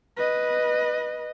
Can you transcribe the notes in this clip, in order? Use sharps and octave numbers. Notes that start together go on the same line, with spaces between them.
B4 D#5